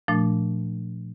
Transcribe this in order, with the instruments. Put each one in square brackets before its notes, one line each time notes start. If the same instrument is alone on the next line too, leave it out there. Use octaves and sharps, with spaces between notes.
[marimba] A#2 F3 A3 D4